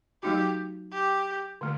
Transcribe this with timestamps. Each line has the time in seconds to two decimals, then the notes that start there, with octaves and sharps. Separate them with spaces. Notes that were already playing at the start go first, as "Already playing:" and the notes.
0.23 F#3 A3 D#4 F#4 G4
0.93 G4
1.61 D3 A3